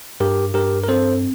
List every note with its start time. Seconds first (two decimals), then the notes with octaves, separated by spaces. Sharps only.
0.20 G2 G4 A#4
0.54 G2 G4 A#4
0.84 A#4
0.88 C4 A4 C5